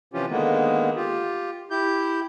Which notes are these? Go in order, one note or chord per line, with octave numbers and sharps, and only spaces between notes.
C3 E3 F3 C#4 F4 G4
D3 D#3 G#3 A#3 B3
F4 G4
E4 G4 G6